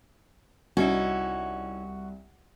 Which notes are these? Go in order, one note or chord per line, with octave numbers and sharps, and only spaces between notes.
C2 C#4 D#4 E4 F#4